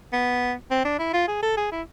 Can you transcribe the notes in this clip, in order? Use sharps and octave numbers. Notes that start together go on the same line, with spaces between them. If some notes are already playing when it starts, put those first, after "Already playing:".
B3
C4
D4
E4
F4
G#4
A4
G#4
E4